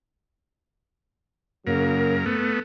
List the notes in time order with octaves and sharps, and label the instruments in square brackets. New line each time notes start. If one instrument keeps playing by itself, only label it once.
[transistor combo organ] F#2 A#4 [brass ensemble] C#3 F#3 A#3
[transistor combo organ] A3 B3